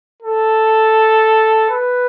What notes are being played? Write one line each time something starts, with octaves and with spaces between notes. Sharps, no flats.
A4
B4